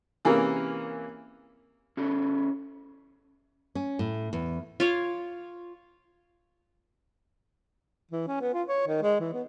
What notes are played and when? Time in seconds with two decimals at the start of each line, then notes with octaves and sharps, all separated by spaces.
0.25 C3 E3 A#3 C#4 G#4 A#4
1.97 C#4 E4 G#4 A4
3.75 C#4
3.99 A2
4.33 E2
4.80 F4 C#5 D6
8.11 E3
8.27 C#4
8.41 B3
8.53 F4
8.68 C#5
8.87 D#3
9.03 G#3
9.20 E3
9.34 B3